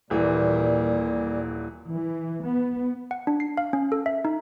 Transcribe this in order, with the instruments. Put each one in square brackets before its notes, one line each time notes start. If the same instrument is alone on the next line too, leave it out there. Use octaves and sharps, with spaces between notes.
[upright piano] D#1 E3 [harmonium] A#2 G3 A#3
[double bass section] E3
B3
[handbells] F#5
D4
C7
F5
C#4
A4
E5
D#4